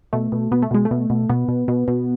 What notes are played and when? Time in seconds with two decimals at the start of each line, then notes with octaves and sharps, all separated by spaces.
0.13 B2 A3
0.32 B2
0.51 B2 B3
0.62 A3
0.71 B2 G#3
0.85 A3
0.91 B2
1.10 B2
1.29 B2 B3
1.48 B2
1.68 B2
1.88 B2